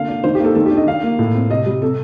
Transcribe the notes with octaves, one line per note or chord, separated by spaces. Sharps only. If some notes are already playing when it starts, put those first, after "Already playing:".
Already playing: D3 A#3 F5
D4
D#3 C5
G4
A#3 A4
D#3 A4
G4
D4
D#5
D#3 F5
A#3
A2
C4
C3 D#5
G3
C3 A4